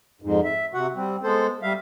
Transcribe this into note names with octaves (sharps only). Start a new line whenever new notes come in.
F2 G#2
E5
C3 F#4 F#5
G3 C4
G#3 B3 A4 C5
G3 E5 F5